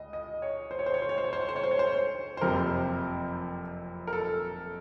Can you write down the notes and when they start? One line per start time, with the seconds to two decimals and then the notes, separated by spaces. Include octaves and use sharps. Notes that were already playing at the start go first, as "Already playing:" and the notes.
Already playing: C#2 D#5
0.13 D#5
0.42 C#5
0.71 C5
0.79 C#5
0.86 C5
0.94 C#5
1.02 C5
1.09 C#5
1.18 C5
1.24 C#5
1.33 C5
1.40 C#5
1.49 C5
1.56 C#5
1.63 C5
1.71 C#5
1.79 C5
1.87 C#5
1.95 C5
2.37 C5
2.41 F#1 F2 C3 F3 A#4
4.07 A#4
4.13 A4